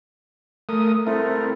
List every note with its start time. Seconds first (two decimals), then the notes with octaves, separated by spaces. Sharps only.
0.69 A3 A#4 D#6
1.07 A3 C4 E4 A#4